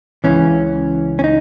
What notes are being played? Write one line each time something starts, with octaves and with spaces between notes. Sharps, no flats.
C#2 C#3 E3 C#4
C#4
D#4